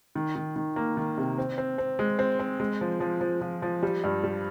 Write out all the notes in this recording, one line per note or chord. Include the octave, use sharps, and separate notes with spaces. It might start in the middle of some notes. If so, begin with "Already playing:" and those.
D#3
D#3
D#3
A#3
D#3
C3
C4
C4
C4
G#3
C4
C4
G#3
F3
F3
F3
F3
F3
G3
G2
G3